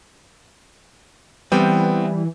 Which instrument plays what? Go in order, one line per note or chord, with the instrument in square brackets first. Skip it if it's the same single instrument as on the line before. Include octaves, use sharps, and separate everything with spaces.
[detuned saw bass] E3 [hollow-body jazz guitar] G3 [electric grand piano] B3 C4 G5